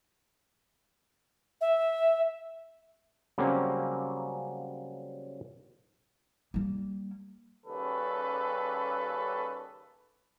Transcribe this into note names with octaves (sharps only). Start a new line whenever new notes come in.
E5
C#3 F#3 G3 A#3 C4 C#4
G3 A#3
D#2 C#3 G3 C#4 A4 B4